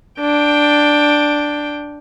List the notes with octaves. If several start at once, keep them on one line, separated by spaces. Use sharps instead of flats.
D4 G5